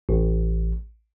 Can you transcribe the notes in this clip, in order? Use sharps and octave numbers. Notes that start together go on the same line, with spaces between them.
A1